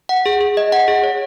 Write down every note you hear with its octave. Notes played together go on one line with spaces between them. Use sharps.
F#5
G#4
G#4
D#5
F#5
G#4
C#5